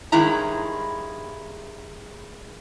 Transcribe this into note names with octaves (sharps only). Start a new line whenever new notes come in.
G2 D#3 G#3 C#4 E4 A#5